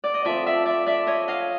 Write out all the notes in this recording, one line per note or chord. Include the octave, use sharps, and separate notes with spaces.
D5
D#5
F3 A3 C4 D5 E5
D5 E5
D5 E5
D5 E5
C#5 D#5
D#5 F5